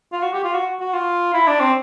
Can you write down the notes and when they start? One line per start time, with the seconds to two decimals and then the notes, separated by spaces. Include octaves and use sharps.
0.12 F4
0.23 F#4
0.33 G4
0.44 F4
0.54 F#4
0.80 F#4
0.94 F4
1.34 E4
1.47 D4
1.60 C4